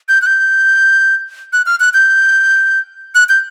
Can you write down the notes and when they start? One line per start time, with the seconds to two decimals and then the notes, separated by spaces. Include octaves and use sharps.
0.08 G6
0.22 F#6
0.26 G6
1.53 F#6
1.66 F6
1.80 F#6
1.94 G6
3.15 F#6
3.29 G6